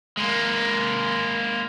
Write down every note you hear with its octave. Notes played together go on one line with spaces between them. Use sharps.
G#3 A#3